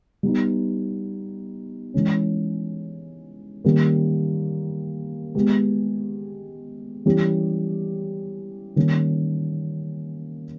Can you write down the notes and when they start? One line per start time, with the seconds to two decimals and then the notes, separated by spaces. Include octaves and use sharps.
0.23 G3 B3 D#4
1.94 E3 G#3 C#4
3.64 D#3 G3 A#3 C#4
5.35 G#3 B3 G4
7.06 E3 G3 C#4 G4
8.76 D#3 G3 A#3 C#4